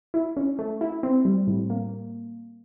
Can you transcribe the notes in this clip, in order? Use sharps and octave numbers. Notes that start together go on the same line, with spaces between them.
E4
C#4
A3
E4
C4
G3
A2
A#3